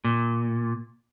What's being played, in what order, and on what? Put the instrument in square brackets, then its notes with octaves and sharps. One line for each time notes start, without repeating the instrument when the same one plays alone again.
[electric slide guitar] A#2